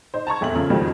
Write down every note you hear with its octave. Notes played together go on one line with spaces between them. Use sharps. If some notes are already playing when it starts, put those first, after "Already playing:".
D#4 C5
A5 A#5 C#6 G#6
F1 E2 E5 F#7
C#3 F3
F2 G#2 B2 D#3 G3